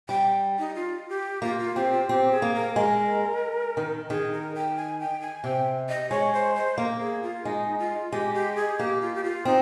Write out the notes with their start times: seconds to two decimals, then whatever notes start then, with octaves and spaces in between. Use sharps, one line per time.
0.08 G3 G5
0.59 D#4
0.75 F4
1.09 G4
1.42 A#3 F4
1.59 F4
1.76 C4 G4
1.92 F4
2.09 C4 G4
2.31 G#4
2.42 A#3
2.54 A#4
2.76 G#3 A#4
3.77 D#3
4.10 D#3 G#4
4.32 A#4
4.55 G5
4.77 G#5
5.00 G5
5.22 G#5
5.44 C3 G5
5.89 D#5
6.11 G#3 C#5
6.34 C5
6.55 C5
6.78 A#3 A#4
7.00 G#4
7.23 F4
7.45 G#3 D#4
7.79 F4
8.12 G#3 G4
8.35 G4
8.56 G#4
8.78 A#3 G4
9.02 F4
9.15 G4
9.24 F4
9.45 C4 D#4